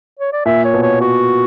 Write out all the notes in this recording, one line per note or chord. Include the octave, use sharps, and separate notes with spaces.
C#5
D5
A#2 E5
C#5
B2
C#5
F#4